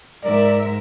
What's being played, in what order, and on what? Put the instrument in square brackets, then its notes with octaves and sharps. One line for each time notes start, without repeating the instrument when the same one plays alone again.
[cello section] G#2 A#4 E5 [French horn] D5